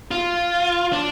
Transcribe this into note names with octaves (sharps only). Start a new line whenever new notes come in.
F4
D4